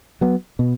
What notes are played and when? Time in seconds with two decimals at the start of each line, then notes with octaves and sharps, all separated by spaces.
0.21 F#3 B3
0.59 B2